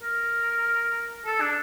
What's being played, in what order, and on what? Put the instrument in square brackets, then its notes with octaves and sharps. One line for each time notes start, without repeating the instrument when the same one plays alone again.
[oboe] A#4
A4
D4